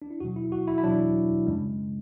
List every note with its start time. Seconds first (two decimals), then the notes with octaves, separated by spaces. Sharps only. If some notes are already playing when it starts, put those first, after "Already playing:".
0.02 D4
0.10 E4
0.20 E2 B2 F#3 F#4
0.36 E4
0.52 F#4
0.68 E4
0.78 E4
0.84 E2 B2 F#3 D4
1.47 F#2 C#3 G#3